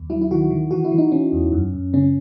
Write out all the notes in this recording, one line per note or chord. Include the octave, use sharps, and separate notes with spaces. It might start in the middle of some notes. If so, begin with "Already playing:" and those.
Already playing: D#2
F#3 E4
E4
D#3 F#4
D#3
E3 F#4
E4
E3
D#4
E3 C#4
E2
F#2
F#2
C#3 C#4